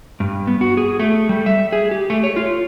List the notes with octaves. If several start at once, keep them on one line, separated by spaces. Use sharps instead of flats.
G2
B3
F#4
G#4
A3
G3
E5
G#4
G4
A3
C#5
F4